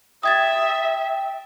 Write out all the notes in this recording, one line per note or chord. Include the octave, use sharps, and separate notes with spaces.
E5 G5 D#6 G#6 A6